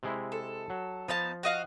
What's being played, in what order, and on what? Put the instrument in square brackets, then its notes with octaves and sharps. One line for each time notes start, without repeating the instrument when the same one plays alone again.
[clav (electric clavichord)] C3 G#3 E4
[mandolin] A4
[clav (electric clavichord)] F#3
[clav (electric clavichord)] F3 [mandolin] B3 D#4 A5
[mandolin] F#4 D#5 F5